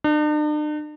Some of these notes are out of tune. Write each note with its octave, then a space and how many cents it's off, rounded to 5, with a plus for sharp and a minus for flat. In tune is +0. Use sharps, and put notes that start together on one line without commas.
D4 +45